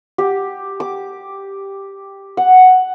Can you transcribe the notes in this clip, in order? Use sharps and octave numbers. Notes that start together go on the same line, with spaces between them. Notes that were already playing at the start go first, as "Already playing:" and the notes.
G4
D6
F#5